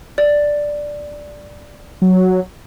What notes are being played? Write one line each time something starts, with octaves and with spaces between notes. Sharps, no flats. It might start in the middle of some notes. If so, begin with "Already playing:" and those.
D5
F#3